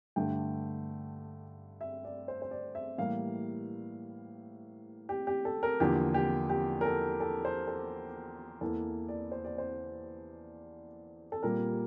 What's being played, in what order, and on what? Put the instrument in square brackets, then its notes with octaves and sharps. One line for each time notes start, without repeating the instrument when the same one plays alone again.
[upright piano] G2 D3 A3 G5
E5
D5
C5
C5
D5
E5
A2 E3 G3 A#3 F5
G4
G4
A4
A#4
E2 D3 F3 A#3 G4
G4
G4
A#4
A4
A4
C5
A4
E2 E3 A#3 A4
D5
C5
D5
C5
A4
A#2 G3 A#3 A#4